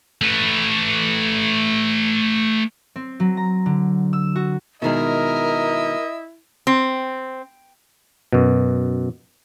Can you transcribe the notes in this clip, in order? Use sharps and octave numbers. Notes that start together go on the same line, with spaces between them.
A3 B4
C4
F#3
A#5
D3
E6
F#4
B2 D#3 G#3 E4 A#4 D#5
C4
F#2 B2